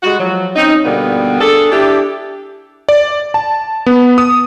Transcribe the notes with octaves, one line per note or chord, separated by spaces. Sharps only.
G3 G#3 F#4
F3 F#3
C4 C#4 D#4
B2 D3 G3 A#3 B3
D4 G#4 A4
D4 E4 G4
D5
A5
B3
D#6